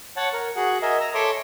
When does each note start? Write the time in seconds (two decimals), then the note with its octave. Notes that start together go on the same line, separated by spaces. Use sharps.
0.17 C#5 F#5 A5
0.33 A#4
0.56 F#4 G#4 F#5
0.82 A#4 D#5 E5 G#5
1.00 A#5 E6
1.14 A4 C#5 E5 C6 D6